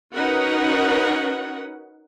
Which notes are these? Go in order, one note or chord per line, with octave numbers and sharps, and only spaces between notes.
C#4 D#4 F#4 A#4 B4 F#5